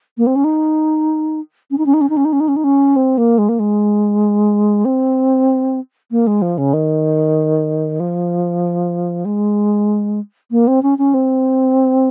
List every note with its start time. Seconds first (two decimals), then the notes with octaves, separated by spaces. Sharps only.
0.18 A#3
0.27 C4
0.36 C#4
0.44 D#4
1.71 C#4
1.78 D#4
1.86 C#4
1.94 D#4
2.01 C#4
2.10 D#4
2.17 C#4
2.25 D#4
2.33 C#4
2.40 D#4
2.48 C#4
2.56 D#4
2.64 C#4
2.96 C4
3.18 A#3
3.38 G#3
3.49 A#3
3.59 G#3
4.85 C4
6.11 A#3
6.27 G#3
6.42 F3
6.58 C#3
6.73 D#3
8.00 F3
9.25 G#3
10.51 A#3
10.67 C4
10.83 C#4
10.98 C#4
11.14 C4